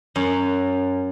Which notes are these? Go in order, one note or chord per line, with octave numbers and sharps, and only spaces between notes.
F#2